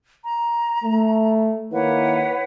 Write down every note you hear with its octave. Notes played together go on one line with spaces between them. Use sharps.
A#5
A3
D#3 A#3 E4 B4 C#5 F#5